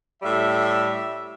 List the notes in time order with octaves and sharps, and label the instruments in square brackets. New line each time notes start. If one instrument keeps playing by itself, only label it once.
[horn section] A2 G3 E5